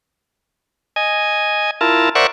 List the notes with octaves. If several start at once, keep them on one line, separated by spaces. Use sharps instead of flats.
D#5 G#5
E4 F4 A#4 A5
A#4 C5 D5 E5 F#5 C#6